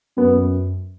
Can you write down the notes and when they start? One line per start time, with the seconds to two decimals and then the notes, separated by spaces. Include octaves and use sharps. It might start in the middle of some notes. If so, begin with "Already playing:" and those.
0.17 F#2 B3